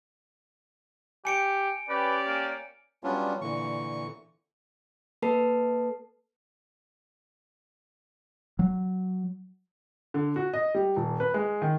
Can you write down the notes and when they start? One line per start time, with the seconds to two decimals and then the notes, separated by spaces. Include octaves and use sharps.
1.25 G4 G#5 C#7 D7
1.89 C#4 G4 B4 D5
2.27 A#3
3.04 F#3 G3 B3 C#4 D4 F4
3.41 A#2 D3 E3 C#6
5.22 A#3 A4 B4 A5 C7
8.59 F#3
10.14 D3
10.36 F#4
10.54 D#5
10.75 G3
10.96 D#1
11.20 B4
11.34 G#3
11.62 D#3